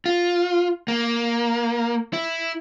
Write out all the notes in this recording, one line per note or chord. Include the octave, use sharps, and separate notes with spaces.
F4
A#3
E4